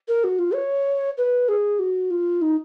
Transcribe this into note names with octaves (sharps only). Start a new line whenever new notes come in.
A#4
F#4
F4
C#5
B4
G#4
F#4
F4
D#4